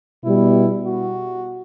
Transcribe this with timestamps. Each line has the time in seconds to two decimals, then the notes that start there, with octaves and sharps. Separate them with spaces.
0.24 B2 G3 B3 E4
0.86 F#4